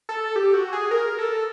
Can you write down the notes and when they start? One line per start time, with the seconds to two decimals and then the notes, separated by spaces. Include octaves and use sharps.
0.09 A4
0.36 G4
0.54 F#4
0.72 G#4
0.91 A#4
1.19 A4